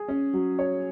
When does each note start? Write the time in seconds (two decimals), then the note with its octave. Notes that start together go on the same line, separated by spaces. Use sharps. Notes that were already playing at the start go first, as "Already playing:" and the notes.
Already playing: G#4
0.08 C#4
0.33 F#3
0.59 C#5